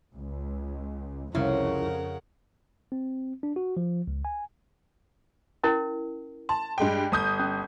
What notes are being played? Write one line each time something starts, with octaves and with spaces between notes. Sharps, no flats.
C#2
C2 F2 C#3 E4 A#4 F#5
C4
D4
F#4
F3
C#2
G#5
C#4 E4 A#4
A5 C6
G2 G#3 G5
G1 D#6 G6
C#4